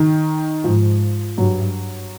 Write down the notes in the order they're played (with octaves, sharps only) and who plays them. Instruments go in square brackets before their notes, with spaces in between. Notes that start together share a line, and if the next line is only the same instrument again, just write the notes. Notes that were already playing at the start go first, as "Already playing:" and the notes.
Already playing: [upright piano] D#3
[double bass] G#2 [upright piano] F3
[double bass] G2 [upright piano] F#3